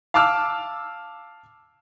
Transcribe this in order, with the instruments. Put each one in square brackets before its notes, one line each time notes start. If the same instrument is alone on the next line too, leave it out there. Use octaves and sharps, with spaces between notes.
[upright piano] F5 A5 D6 E6 F6